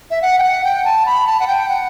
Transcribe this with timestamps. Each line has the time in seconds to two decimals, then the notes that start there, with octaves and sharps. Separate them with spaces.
0.11 E5
0.22 F#5
0.39 G5
0.43 F#5
0.64 G5
0.85 A5
1.06 B5
1.27 A5
1.40 F#5
1.47 G5
1.68 F#5